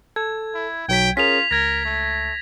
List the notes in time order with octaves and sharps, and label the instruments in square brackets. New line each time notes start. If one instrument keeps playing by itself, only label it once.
[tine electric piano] A4 [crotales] G#6
[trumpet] E4
[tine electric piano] B1 F#3 B6 [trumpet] G5
[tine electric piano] C#4 G#4 A#4 [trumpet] F4 [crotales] B6 F7
[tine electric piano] C#2 [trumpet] A#4 [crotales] G#6 A#6
[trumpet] A3